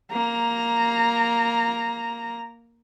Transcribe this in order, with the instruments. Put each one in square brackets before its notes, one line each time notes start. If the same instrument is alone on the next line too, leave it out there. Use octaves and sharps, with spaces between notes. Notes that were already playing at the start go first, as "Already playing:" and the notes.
[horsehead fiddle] A#3 A#5